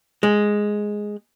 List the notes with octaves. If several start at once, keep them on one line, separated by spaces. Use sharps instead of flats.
G#3